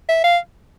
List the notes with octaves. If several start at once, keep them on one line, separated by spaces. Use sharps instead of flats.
E5
F5